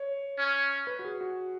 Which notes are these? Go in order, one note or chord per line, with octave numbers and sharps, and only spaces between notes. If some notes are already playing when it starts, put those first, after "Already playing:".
Already playing: C#5
C#4
B4
F#4
G#4
F#4